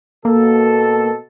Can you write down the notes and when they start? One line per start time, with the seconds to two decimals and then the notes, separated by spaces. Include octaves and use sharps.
0.25 B2 A#3 A4